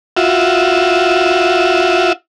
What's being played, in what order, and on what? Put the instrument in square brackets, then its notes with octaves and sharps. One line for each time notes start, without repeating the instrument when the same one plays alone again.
[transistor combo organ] F4 F#4 E5